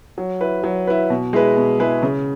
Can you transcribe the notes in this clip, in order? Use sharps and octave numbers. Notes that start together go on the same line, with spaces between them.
F#3
E4 B4
F#3
E4 B4
B2
G#3 E4 G#4 B4
B2
G#3 E4 G#4 B4
C#3